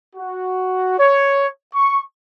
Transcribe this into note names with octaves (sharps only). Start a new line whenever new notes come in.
F#4
C#5
C#6